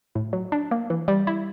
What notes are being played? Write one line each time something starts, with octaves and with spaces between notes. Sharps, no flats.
A2
F#3
D4
A#3
E3
G3
E4